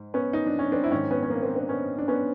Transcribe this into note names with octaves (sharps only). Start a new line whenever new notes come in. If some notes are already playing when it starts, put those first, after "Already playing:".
Already playing: G#2
B3 C#4
D#4
D4
C#4
C4 D4
E4
G#2 D#3 C#4 D#4
B3 C#4
C#4
A#3 C4
A#3 C4
C4 D4
B3 C#4
D4
B3 C#4